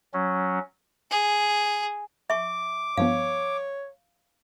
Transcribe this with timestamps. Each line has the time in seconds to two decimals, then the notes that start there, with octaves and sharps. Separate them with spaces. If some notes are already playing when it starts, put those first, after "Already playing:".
0.14 F#3 C#4
1.11 G#4
2.30 E5 C#6 D6
2.97 G2 F3 B3 C#5 F5